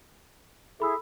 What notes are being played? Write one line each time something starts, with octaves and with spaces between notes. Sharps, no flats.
E4 G#4 A4 E5 B5 E6